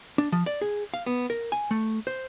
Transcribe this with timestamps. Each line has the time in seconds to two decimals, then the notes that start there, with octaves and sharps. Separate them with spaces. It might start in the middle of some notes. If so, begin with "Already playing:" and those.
0.18 D4
0.32 F3
0.46 D5
0.61 G#4
0.94 F5
1.06 B3
1.30 A#4
1.52 G#5
1.71 A3
2.07 C5